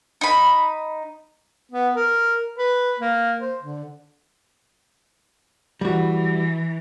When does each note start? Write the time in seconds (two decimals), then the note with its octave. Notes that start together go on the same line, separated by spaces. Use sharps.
0.21 D#4 B5
1.71 B3
1.95 A#4
2.58 B4
2.99 A#3
3.40 C5
3.62 D3
5.81 E3 G3 F#4